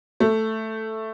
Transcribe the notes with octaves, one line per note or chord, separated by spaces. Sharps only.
A3